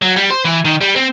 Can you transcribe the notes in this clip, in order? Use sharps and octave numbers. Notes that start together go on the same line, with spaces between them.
F#3
G3
C5
E3
D#3
G3
C4